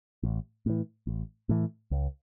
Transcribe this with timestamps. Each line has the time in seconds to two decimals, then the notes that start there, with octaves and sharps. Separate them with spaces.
0.23 A1
0.66 A2 E3
1.07 A1
1.49 A2 E3
1.91 C#2